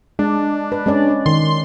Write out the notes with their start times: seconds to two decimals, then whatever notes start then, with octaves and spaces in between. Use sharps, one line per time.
0.19 G#3 D4
0.72 B4
0.86 G#3 C#4 D5
1.26 D#3 C6